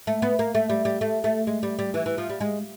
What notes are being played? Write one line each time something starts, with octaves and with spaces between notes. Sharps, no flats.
A3
B3
A#3
A3
G3
G3
A3
A3
G#3
G3
G3
E3
E3
F3
G3
G#3